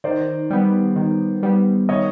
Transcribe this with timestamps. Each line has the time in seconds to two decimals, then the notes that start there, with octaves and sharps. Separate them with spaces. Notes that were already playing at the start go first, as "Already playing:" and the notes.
0.04 D#3 C5 D5
0.50 G3 B3
0.96 D#3
1.43 G3 B3
1.89 D#3 C#5 D#5